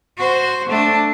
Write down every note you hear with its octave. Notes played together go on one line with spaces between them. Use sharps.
F#4 C5
A3 D4